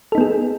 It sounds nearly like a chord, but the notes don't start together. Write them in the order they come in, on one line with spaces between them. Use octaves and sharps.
A4 D#4 B3 G#4